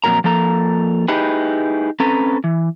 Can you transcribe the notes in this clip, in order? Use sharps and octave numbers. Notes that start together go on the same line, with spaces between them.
F2 A#2 F#3 A#4 A#5
F3 A#3 A4 A#5
D#4 E4 G4 G#4 B4
C4 C#4 A4 B4 A#5
E3